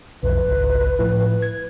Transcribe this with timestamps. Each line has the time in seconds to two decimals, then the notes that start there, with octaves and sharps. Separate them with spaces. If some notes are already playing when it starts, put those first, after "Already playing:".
0.23 B1 F2 B4
0.45 G#1 C#2
0.99 A2 F3 E4
1.42 G#6